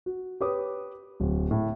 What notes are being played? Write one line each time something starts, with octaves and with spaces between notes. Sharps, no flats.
F#4
G4 B4 C#5 D6 D#6
D1
A2